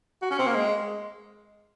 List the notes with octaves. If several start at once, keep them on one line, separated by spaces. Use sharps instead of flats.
F#4
C#4
C4
A#3
G#3